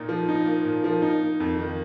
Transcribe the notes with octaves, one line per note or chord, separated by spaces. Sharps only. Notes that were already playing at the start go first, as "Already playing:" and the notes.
Already playing: A#2 A#3 D#4
F3
D#4
A#3
A#2
F3
D#4
A#3
F2
D#3